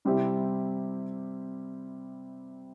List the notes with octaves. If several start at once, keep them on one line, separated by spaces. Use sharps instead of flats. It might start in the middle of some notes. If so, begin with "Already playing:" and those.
C3 G3 C4 E4 G4